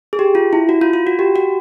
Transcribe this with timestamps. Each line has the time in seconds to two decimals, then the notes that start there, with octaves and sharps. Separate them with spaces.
0.13 G#4
0.19 G4
0.35 F4
0.53 E4
0.69 F#4
0.81 F4
0.93 F4
1.07 F#4
1.19 G4
1.36 F#4